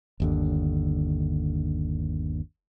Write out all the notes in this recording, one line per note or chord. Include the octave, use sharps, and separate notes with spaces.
G1 D#2 D3